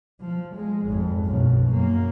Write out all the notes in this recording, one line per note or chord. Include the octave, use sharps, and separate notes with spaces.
F3
G#3
G#1 F2
B1 F#2
F#2 A#3